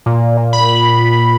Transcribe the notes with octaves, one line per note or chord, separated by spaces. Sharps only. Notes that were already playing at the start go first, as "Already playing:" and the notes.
A#2
A#2
B5